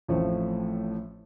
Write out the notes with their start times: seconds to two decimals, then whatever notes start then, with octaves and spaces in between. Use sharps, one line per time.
0.08 A1 A2 F3 A3 C4